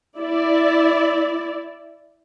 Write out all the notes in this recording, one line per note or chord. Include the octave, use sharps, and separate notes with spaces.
E4 D5